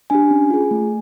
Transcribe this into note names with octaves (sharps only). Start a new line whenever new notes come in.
D4 G4 G#5
C#4
F4 G#4
A3